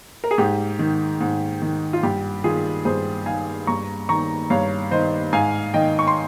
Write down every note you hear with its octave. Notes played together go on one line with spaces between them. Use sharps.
A#4
G#4
G#2 G4
D#3
G#2
D#3
F4
G2 G4
D#3 F4 G#4
G2 G#4 C5
D#3 F5 G#5
G2 A#5 C#6
D#3 A#5 C#6
G2 C#5 F5
D#3 C5 D#5
G#2 F5 G#5
D#3 D#5 G5
C#6
C6